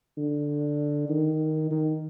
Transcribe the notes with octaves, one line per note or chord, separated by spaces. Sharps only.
D3
D#3
D#3